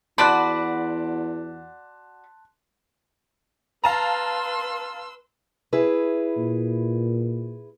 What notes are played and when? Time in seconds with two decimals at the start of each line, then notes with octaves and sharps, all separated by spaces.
0.18 E2 F#4 D5 A5 B5 C6 F#6
3.84 B4 F5 A5 A#5 C6 E6
5.73 E4 G#4 B4
6.37 A#2